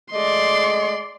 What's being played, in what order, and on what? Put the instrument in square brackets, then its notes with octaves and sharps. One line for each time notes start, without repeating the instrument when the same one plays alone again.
[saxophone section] G#3 A3 D#5 [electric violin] D5 C6